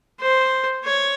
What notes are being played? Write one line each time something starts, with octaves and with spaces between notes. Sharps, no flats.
C5
C#5